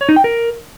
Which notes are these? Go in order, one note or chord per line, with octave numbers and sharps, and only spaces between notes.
C#5
D#4
G5
A#4